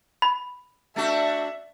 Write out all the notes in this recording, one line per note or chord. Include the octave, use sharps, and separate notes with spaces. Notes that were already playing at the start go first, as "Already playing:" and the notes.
B5
A3 D4 F#4 E5